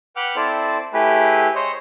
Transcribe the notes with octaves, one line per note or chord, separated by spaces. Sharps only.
B4 F#5 G5 D6 F6 F#6
C4 E4 A4 C5 D5
A3 E4 G4 G#4 B4
C5 C#5 D#5